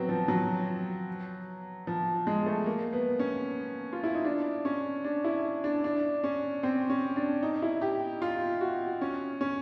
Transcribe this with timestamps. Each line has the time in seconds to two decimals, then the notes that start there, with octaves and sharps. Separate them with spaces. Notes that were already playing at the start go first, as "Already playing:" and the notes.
Already playing: F#3 B3 C4
0.09 F3
0.28 F#3
1.87 F3
2.27 G#3
2.46 A3
2.66 A#3
2.93 B3
3.19 C#4
3.93 F4
4.04 E4
4.14 D#4
4.25 D4
4.65 C#4
5.04 D4
5.24 E4
5.64 D4
5.84 D4
6.24 C#4
6.63 C4
6.90 C#4
7.16 D4
7.43 D#4
7.62 E4
7.82 G4
8.22 F4
8.61 F#4
9.01 C#4
9.41 C#4